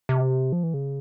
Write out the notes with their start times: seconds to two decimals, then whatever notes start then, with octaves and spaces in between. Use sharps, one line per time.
0.09 C3
0.52 F3
0.63 E3
0.74 C#3